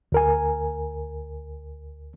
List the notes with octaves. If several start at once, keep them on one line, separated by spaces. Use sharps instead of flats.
D2 A#4 G#5